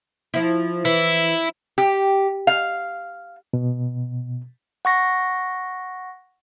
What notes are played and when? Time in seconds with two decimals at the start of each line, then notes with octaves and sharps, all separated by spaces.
0.34 F3 E4
0.85 E3 E4
1.78 G4
2.47 F5
3.53 B2
4.85 F#5 C#6 A#6